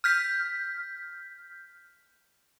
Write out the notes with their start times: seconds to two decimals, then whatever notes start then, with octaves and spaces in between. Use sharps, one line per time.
0.04 F6 G6 B6